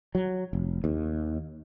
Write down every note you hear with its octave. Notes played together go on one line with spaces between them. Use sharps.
F#3
F1
D#2